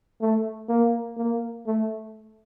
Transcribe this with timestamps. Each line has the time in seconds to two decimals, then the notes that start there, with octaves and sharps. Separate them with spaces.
0.21 A3
0.69 A#3
1.17 A#3
1.67 A3